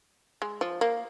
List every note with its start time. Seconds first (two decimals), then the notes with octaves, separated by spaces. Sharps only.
0.42 G#3
0.61 F3
0.81 A#3